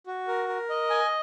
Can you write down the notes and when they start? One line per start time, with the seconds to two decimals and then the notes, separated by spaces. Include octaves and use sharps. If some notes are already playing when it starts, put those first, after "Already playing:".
0.07 F#4
0.28 A#4
0.48 A#4
0.70 D#5
0.90 G#5